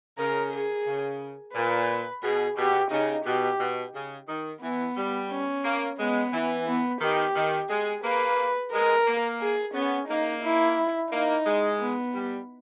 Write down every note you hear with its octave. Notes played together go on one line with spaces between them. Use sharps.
C#3 A#4
G#4
C#3
A#2 B4
B2 G#4
B2 G4
C#3 D#4
B2 G4
B2
C#3
D#3
E3 B3
G3
C#4
A#3
G#3 B3
E3
B3
D#3 G4
D#3
G#3 G#4
A#3 B4
G#3 A#4
A#3
G#4
B3 C#4
A#3 D#4
E4
A#3 D#4
G#3
B3
G3